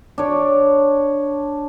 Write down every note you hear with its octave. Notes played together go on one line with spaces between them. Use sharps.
D4 C#5